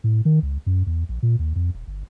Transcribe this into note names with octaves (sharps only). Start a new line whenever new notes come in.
A2
D#3
C#2
F#2
E2
A#1
A#2
D#2
F2
D#1
G1